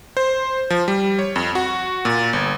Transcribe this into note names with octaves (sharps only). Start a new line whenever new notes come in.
C5
F3
G3
C#5
F2
F#4
A#2
G1